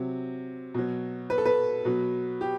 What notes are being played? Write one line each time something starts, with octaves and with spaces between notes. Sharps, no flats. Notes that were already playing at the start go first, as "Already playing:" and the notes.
Already playing: C3 F#3
B2 F#3
B4
A4
B4
B2 F#3
G4